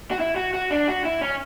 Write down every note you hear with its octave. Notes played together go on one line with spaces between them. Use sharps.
F#4
E4
F#4
F#4
D4
F#4
E4
C#4